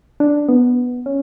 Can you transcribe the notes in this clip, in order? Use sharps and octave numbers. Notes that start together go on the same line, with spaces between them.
D4
B3
C#4